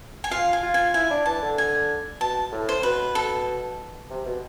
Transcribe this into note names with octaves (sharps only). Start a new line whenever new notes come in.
G#5
F4 F5
G#5
F4
G#5
E4 G#5
D4
E3 A5
D3
G#5
B2 A5
A2
C5
B2 B4
A4
C3
B2